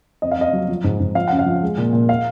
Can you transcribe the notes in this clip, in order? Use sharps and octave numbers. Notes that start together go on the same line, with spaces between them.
F2 D#5
F5
F2 D#5
F#3
F3
G#2
G#2
F3 F5
F#2 F#5
F5
F3
G#3
A#2
A#2
F5